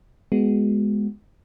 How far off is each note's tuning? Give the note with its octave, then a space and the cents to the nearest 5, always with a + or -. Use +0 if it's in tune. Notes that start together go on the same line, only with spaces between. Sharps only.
G#3 +5 B3 +0 F#4 +0